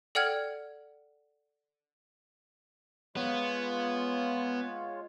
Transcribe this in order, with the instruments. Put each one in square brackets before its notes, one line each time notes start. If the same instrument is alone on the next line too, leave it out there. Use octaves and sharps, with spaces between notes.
[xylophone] A4 D5 F#5 G5 F6 G#6
[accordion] G#3 F4 C#5 [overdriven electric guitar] B3